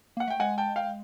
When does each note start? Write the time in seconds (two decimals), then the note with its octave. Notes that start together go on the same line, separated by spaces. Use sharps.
0.17 A#3 F#5
0.27 A3 G5
0.40 G#3 F#5 G#5
0.58 G5 A5
0.76 F5 G5